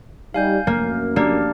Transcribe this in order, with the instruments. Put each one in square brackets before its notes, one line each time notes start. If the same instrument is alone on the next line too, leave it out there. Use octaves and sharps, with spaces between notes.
[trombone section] G3 D#4 [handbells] F5 G#5 G6
[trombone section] F#2 [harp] A#3
[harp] A#3 [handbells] D4 G4 D5